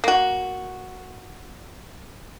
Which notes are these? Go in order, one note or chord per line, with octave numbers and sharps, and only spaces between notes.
A#3 F#4